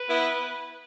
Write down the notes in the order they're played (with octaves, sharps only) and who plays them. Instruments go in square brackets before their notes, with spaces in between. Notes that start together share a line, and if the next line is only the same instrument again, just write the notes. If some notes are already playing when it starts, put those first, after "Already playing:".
Already playing: [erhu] B4
[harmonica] B3 E4